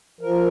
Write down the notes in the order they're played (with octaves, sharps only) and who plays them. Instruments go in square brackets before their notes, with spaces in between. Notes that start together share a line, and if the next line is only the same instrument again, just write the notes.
[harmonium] F3 A#4